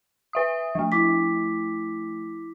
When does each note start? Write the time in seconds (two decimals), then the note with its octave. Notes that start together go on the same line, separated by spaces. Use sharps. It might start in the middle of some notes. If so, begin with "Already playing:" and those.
0.33 B4 E5 D#6
0.75 F3 A3
0.92 E4 D6 B6